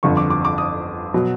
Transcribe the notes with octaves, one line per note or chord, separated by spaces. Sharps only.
G1 F2 D3 C#6
D6
D6
D6
D#6
B2 F#3